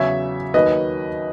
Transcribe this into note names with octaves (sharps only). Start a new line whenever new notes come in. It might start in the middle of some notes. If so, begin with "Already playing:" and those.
Already playing: E2 C#3 F#3 C#5 E5
D#2 D#3 F#3 B4 D#5